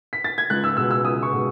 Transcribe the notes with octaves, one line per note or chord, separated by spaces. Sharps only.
B6
A6
G#6
C#2 F#6
E6
B2 G#3 E6
E6
C#2 D#6
C#6
B2 G#3